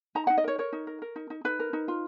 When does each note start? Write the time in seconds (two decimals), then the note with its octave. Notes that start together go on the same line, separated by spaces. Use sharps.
0.15 D#4 A#5
0.27 F#5
0.30 D#4
0.38 D#5
0.44 A#4 C#5
0.58 A#4 C#5
0.72 D#4
0.87 A#4
1.02 A#4
1.16 D#4
1.30 D#4
1.44 D#4 B4
1.60 A#4
1.73 D#4
1.88 F4